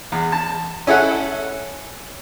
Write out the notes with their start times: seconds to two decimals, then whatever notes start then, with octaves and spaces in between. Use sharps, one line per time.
0.12 E2
0.32 A5
0.87 C#4 E4 A4 F#5